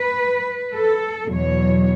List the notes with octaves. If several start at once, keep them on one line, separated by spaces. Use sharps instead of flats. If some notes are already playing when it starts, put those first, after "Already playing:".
Already playing: B4
A4
E2 B2 F#3 C#5